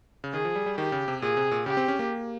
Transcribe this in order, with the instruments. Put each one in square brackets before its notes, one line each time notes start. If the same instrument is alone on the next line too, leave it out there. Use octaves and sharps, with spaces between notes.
[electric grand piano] C#3
[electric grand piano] D#3 [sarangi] G#4
[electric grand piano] F3
G3
G3
[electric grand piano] D#3 [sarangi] G4
[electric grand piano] C#3
C3
[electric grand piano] A#2 [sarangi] G#4
[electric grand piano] C3
A#2
[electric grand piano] C#3 [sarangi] G4
[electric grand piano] C4
C#4
A#3